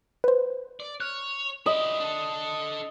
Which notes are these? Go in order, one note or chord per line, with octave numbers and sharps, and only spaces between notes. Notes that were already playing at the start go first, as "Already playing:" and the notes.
B4 C5
D5
C#5 F6 F#6
E4 G4 D#5
D4 A4